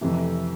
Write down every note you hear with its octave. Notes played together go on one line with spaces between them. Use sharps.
F2 C3 E3 A3